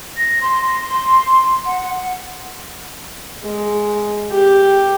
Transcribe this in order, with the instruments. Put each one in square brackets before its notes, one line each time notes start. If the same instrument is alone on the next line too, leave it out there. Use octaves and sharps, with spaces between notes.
[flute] A#6
C6
F#5
[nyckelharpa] G#3
G4